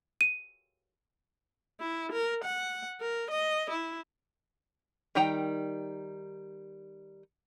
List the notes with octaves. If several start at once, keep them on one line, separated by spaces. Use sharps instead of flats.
D#7
E4
A#4
F#5
A#4
D#5
E4
D#3 G3 D#4 G5 A#5